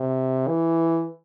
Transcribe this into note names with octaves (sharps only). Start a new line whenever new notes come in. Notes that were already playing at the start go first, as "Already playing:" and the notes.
Already playing: C3
E3